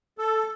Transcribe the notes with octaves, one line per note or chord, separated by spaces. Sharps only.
A4